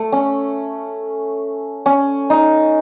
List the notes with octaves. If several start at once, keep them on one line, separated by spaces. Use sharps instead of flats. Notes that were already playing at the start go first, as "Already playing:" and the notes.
Already playing: A3
C#4
C#4
D#4